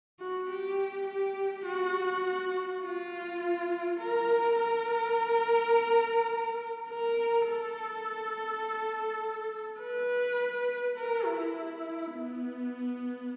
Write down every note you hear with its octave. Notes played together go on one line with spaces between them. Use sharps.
F#4
G4
G4
F#4
F4
A#4
A#4
A#4
A4
B4
A#4
E4
B3